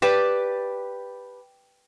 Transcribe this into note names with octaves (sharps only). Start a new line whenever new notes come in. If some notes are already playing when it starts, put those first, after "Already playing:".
G4 B4 D5 A5